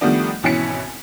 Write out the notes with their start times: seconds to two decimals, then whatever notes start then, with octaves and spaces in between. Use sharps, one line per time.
0.01 D#3 F3 G3 A3 B3 D4
0.43 G#1 B2 E3 C#4 B6 C#7